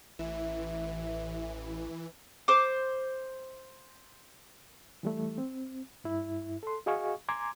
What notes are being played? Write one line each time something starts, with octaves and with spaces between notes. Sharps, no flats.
A1 E3 E5
C5 D6
E3 G3 A3
C4
G2 E4
A4 C6
F#4 G#4 D#5 F5 G#5 C#6
G#5 A#5 C6 D6 G#6